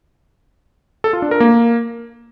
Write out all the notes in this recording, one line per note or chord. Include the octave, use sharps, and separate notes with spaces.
A4
F4
D4
A#4
A#3